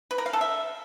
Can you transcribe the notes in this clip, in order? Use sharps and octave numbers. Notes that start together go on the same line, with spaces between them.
B4
A#4
F5
A4
E5